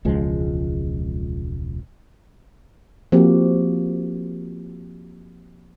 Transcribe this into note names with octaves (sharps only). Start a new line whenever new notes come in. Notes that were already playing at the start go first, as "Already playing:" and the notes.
E1 C#2 F3 G#3
F3 A#3 C4 F#4 G4